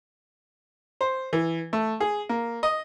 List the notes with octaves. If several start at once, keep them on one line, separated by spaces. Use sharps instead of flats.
C5
E3
A3
G#4
A#3
D#5